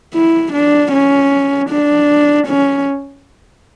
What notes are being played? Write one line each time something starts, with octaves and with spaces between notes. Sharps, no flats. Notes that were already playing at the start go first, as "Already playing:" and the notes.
E4
D4
C#4
D4
C#4